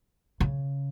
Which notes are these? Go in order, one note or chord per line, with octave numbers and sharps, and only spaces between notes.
C#3